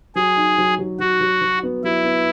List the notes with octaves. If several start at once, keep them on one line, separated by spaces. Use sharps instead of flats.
F#3 G#4
D#4
F#3
F#3
F#3 F#4
F#3
F#3
B3
F#3 E4
B3